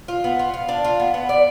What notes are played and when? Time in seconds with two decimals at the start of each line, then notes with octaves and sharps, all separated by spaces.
0.08 F4
0.24 B3
0.39 F4
0.54 F4
0.69 D4
0.84 F4
1.00 B3
1.14 B3
1.29 D5